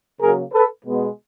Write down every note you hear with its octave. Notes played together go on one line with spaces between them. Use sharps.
C#3 F#3 A#3 G#4 A#4
A4 B4
B2 G#3 B3